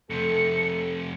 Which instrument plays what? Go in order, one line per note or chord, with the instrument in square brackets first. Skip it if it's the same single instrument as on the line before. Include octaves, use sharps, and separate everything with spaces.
[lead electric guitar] F2 C3 [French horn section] A3 A4 [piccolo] C#7